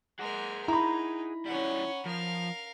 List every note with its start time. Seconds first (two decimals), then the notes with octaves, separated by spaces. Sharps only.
0.20 G#3 G#4 A#4 F#5
0.68 D#4 E4 A#5 B5
1.46 E3 G3 C#4 F#5
2.05 F3 A#4 F5